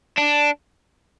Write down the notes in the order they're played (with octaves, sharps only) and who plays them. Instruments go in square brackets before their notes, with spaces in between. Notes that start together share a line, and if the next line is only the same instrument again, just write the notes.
[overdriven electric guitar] D4